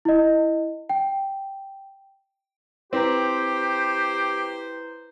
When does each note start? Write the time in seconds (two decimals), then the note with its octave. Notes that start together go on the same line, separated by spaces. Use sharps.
0.05 E4 D#5
0.89 G5
2.93 C4 E4 G4 B4 C5 A#5